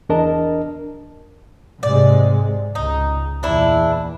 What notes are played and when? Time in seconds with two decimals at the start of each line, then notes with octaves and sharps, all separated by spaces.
0.09 E2 D4 A#4 D#5 A5
1.83 G#2 C3 G#3 D5
2.75 C#2 D#4
3.43 E2 A#2 D4 E4